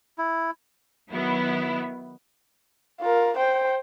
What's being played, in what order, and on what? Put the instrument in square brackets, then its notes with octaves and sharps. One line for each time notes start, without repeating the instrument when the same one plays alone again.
[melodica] E4
[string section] D#3 F#3 B3 E4
[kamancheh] F4 A#4
C5 G5